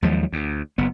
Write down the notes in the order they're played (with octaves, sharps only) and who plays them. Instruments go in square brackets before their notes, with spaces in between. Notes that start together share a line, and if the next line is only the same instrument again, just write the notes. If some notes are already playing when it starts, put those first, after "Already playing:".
[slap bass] D#2 F3 F#3 G#3
D2
F#1 B3